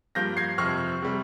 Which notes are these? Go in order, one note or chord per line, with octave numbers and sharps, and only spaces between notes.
G2 F3 A#3 G6 A#6
G#6 C7
F2 C3 F3 C4 C#6 F6
C3 G3